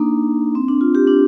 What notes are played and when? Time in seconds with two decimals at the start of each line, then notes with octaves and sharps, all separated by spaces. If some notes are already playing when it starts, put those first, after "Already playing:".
Already playing: A#3 D4 D#4
0.55 C4
0.68 D4
0.81 F4
0.95 G4
1.07 D4